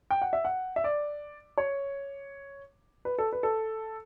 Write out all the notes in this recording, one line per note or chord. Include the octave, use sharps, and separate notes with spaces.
G5
F#5
E5
F#5
E5
D5
C#5
B4
A4
B4
A4